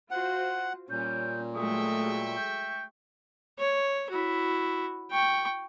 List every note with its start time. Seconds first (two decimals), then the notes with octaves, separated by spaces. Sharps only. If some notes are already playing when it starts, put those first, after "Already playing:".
0.11 F4 F#4 C5 F#5
0.90 A#2 G3 C#4 G6
1.55 F#3 G#3 A3 E5 G5 C#6 D#6
2.36 G6
3.58 C#5
4.10 E4 F#4
5.11 G5 C#6